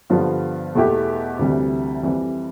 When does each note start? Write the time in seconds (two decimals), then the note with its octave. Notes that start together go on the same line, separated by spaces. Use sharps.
0.10 G2 D3 F3 B3 F4
0.75 E2 B2 A3 E4 G4
1.39 D2 C3 E3 G3
2.03 F2 E3 G3